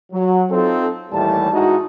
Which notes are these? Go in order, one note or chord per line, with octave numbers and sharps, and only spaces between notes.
F#3
C4 D#4 F4 A4
D#2 A2 E3 G3 A5
G#2 G#3 D#4 E4 F#4